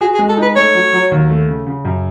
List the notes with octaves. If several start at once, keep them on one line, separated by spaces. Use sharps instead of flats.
F#4 G#4
G#4
G#3
A4
D#4 B4
A3 C#5
F#3
F#3
D#2
A3
C#3
C#3
F#2